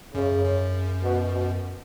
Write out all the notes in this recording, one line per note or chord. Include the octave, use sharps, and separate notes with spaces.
F#2 C#3
F#2
B2
B2